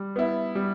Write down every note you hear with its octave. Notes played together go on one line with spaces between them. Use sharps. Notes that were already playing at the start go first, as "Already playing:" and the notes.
Already playing: G3
B3 E4
G3